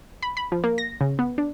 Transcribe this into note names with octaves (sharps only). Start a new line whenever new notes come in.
B5
B5
F3
A#3
A#6
C#3
B3
D4